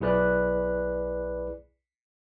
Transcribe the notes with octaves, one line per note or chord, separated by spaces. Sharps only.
B1 E4 G#4 B4 D5 F#6